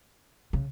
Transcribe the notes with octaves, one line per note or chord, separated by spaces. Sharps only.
C#3